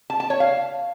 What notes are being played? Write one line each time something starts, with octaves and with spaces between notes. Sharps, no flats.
A5
A5
C#5
F5